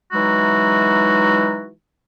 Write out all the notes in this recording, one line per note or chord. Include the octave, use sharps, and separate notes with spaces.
E3 F#3 G#3 D#4 E4 F#4